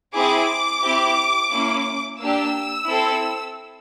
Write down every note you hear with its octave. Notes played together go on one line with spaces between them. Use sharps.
C4 E4 G#4 D6
C4 E4 G4
A#3 C#4 E4
A#3 D4 G4 E6
C4 E4 A4